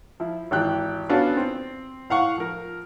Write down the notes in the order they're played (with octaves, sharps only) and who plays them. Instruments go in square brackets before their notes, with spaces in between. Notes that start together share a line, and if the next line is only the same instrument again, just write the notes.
[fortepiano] F3 E4
G#1 E3 G4 G5 F#6
B3 C#4 D4 F4 F#4 A4
C4
A2 F5 F#5 C#6
F3 A#4